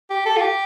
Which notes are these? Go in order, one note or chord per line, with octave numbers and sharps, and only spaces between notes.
G4
A4
F4
G4